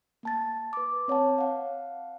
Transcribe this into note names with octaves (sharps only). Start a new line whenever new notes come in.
A#3 A5 A6
B4 D6
C4 C#5 F#5 A5
F5 F#5